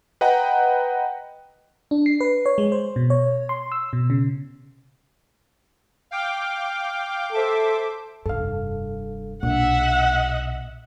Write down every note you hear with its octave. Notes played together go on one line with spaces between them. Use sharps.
B4 D#5 F#5 G5 A#5
D4
C7
B4
C#5
G#3
C5
B2
C#5
C6
E6
B2
C#3
F5 G5 D6
A4 C5 E5 D6
F1 G2 A4 F5
B1 A#2 D4 E5 F#5